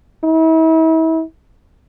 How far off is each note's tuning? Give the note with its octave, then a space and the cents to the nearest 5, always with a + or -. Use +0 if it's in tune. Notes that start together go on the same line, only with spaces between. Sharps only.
E4 -40